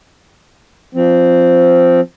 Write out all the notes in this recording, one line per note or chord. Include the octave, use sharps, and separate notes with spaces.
F3 C4